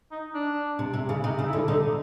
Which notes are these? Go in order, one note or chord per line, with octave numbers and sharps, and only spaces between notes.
D#4
D4
C3
C3
C#3
C3 D#4
C#3
E4
D3
D3 D#4